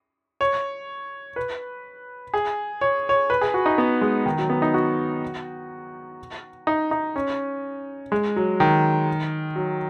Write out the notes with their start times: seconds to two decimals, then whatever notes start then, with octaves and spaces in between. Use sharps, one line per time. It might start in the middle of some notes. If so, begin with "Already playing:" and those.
0.41 C#5
1.36 B4
2.34 G#4
2.81 C#5
3.09 C#5
3.30 B4
3.41 G#4
3.54 F#4
3.66 D#4
3.78 B3
4.01 G#3
4.26 D#3
4.38 F#3
4.50 B3
4.62 D#4
4.74 F#4
6.67 D#4
6.91 D#4
7.16 C#4
8.12 G#3
8.36 F#3
8.60 D#3
9.56 F#3